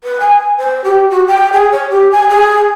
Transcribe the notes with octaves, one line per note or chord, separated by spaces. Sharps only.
B4
G#5
C5
G4
F#4
G5
G#4
C#5
G4
G#5
G#4